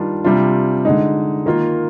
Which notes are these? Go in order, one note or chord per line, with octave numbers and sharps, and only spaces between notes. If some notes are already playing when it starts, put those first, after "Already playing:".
Already playing: D#3 G3 D4 F4
C3 G3 D4 F4
D3 G#3 D#4
D#3 A#3 F4